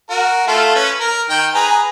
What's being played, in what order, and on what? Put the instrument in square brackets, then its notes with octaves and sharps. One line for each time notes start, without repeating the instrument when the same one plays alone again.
[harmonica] F#4 A#4
A3 F4 A4
C#4 B4
A#4
D#3 G5
G#4 B4 A#5